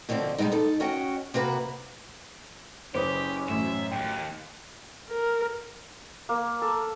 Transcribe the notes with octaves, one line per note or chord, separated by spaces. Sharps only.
B2 D3 F3 G3 C4
B2 G3 G#3 B3 D#4
D#4 A4
C#4 F#4 D#5 G5
C3 A#3 F#4 B4
F#1 C#4 G4 B4 C5 D6 D#6
A1 F#2 E5
D#2 G#2 G5
A#4
A#3
A4